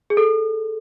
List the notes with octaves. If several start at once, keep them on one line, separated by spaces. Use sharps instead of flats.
G#4
A4